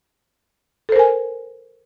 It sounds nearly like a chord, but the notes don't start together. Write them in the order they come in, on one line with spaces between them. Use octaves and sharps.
A4 C5 A#4 G#5